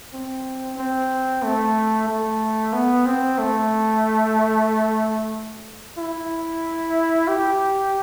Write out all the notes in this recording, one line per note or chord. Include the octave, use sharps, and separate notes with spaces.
C4
C4
A3
A3
B3
C4
A3
E4
G4